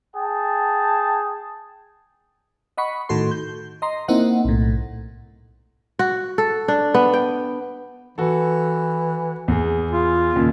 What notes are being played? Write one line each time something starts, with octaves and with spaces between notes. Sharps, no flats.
G#4 G5 A5
D#5 F#5 B5 C#6
A2 D#3 F#4 A4 C6
G6
D#5 A#5 C6
A#3 C4 D#4 E4 D#5 F#5
B1 A2
F#4
A4
D4
B3
G5
E3 F#4 A4
E2 G#4
F4
D#2 A#2 C#3